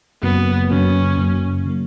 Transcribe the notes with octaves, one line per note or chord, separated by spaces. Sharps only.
F#2 C#3 F#3 A#3 B3
F#2 C#3 F#3 A#3 C#4
F#2 C#3 F#3 A#3
C#3 F#3 A#3